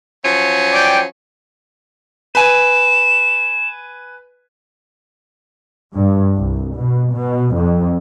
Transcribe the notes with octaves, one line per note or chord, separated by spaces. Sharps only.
F3 F#3 C#4
D5 G5
B4 G#5 E7
G2
C2
B2
B2
F2